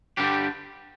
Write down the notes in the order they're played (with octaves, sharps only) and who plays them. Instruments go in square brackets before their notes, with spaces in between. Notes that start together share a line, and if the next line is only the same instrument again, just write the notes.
[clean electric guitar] G2 D3 G3 D4 G4